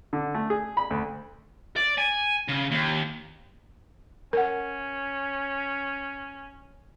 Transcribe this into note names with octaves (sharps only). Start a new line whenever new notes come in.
D3
A3
G#4
B5
D2
D5
G#5
C#3
D#2
C#4 A#4 F#5